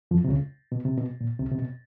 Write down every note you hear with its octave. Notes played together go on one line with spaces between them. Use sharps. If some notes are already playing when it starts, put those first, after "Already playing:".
F2 F3
C3
C#2 C#3
B2
C3
B2
A#2
C2 C3
C3
B2